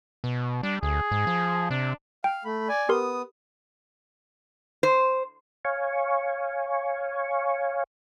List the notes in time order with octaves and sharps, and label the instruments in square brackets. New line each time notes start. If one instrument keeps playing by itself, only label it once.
[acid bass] B2
[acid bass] G3 [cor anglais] D4
[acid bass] D2 [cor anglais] G#4
[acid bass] G#2
F3
[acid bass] C3 [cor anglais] D4
[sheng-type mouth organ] F5 [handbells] G5
[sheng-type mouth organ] A3 B5
D5 G#5
[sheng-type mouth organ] B3 D#6 [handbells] G4 A#4 C6
[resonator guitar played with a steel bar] C5
[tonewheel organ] C#5 F5 G#5 C#6